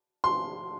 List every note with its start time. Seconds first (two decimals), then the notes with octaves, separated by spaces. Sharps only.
0.24 C6